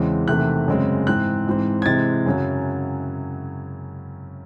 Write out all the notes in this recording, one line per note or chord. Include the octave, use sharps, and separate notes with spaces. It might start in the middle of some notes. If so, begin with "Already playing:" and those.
Already playing: E2 C#3 E3 G#3 C4
E2 C3 D#3 A3 C4 F#6
F#2 C#3 G#3 C4
G#2 E3 C4 F#6
G#2 E3 C4
G#6
C3 E3 G#3 C4 A6
F#2 C#3 F#3